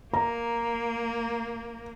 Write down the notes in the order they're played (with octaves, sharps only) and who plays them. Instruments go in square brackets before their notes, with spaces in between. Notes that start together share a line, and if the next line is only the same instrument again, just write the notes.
[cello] A#3 [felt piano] A#5